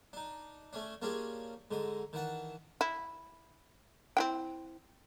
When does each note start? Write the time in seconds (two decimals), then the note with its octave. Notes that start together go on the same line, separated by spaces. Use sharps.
0.13 D4 D#4
0.73 A3 C#4 D4
1.02 A#3 C#4 D4 F4 G4 G#4
1.71 G#2 D3 D#5
2.13 D#3 E3 F#5 A5
2.81 E4
4.17 C4 E4 G5